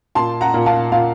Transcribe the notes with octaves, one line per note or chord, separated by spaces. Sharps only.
A#2 A5 C6
F#5 A#5
A#2
F5 A5
A#2 F5